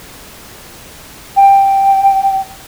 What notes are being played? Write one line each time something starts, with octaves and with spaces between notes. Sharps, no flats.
G5